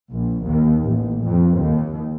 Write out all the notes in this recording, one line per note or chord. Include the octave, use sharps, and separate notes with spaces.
A#1
D#2
A1
F2
D#2